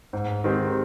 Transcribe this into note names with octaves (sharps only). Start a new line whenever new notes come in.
G#2
D#3 G#3 C4 G4